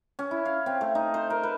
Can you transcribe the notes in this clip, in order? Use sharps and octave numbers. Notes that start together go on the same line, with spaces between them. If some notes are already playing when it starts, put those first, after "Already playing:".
C#4
E4
F5
C4
A3
D#4
C5
A#4
B4